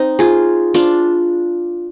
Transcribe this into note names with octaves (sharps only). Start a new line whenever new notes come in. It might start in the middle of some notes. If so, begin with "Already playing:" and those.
Already playing: C4 D#4
F4 G#4
D4 F4